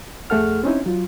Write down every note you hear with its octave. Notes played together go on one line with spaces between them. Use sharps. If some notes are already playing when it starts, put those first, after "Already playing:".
F2 A3 G#4 A4 F#5 F6
C4 C#4 D#4 E4
F#3 F4